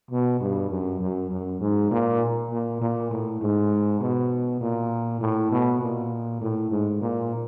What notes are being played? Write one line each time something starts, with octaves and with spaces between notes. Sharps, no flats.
B2
G2
F#2
F#2
F#2
G#2
A#2
A#2
A#2
A2
G#2
B2
A#2
A2
B2
A#2
A2
G#2
A#2